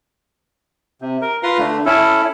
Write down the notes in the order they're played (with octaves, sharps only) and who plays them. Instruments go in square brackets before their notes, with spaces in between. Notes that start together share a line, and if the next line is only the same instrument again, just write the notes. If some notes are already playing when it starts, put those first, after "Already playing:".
[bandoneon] C3
A#4
F4 B4 A#5 C6
D3 A3
C#4 E4 A4